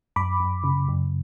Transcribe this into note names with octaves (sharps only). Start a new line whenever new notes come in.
F#2 B5 D6
F#2
C#3
F#2